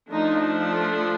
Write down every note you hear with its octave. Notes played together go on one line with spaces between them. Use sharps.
F3 A3 D4 D#4